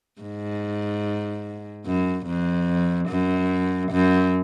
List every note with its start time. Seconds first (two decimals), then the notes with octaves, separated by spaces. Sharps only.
0.21 G#2
1.86 F#2
2.26 F2
3.09 F#2
3.91 F#2